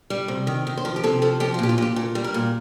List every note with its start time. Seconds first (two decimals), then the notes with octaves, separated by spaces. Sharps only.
0.10 G3
0.28 C3
0.47 D#3
0.67 D#3
0.77 C5
0.85 F3 A#4
0.96 G4
1.04 C3 A4
1.22 F3 A4
1.40 F3 G4
1.54 F4
1.59 A#2 G4
1.69 F4
1.78 A#2 G4
1.96 A#2 A4
2.15 G3
2.24 A#4
2.34 A#2